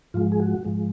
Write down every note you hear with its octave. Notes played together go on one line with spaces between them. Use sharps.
G#2 F3 G#3 F4
G#4
F#4
G#2 F3 G#3